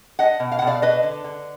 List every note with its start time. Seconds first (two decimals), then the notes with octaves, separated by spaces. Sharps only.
0.19 D4 D#5 F#5
0.40 B2
0.52 F5
0.59 B2 F#5
0.67 D5 F5
0.82 D4 B4 D#5
1.03 D3
1.24 D3